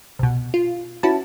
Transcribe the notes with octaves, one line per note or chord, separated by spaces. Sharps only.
C2 B2
F4
C#4 E4 F#4 B4 A5